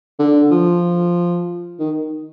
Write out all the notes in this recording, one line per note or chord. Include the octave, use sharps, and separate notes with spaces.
D3
F3
D#3